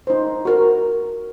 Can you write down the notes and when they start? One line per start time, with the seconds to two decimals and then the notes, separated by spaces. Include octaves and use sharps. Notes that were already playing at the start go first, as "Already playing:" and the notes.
0.07 D#4 C5
0.45 F#4 A#4